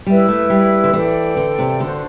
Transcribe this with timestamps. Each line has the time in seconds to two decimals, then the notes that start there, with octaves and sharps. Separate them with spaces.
0.06 G3 E4 B4 E5
0.28 A3
0.50 G3
0.84 D3
0.93 E3 A4 D5 G5
1.37 D3
1.58 C3
1.80 D3 D4 F#4 C5